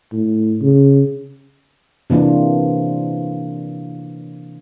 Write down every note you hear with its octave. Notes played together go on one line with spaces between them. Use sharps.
A2
C#3
C3 E3 A#3 D4 F4